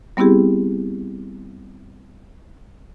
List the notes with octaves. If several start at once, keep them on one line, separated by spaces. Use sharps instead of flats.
G3 B3 C4 E4 G4 G#4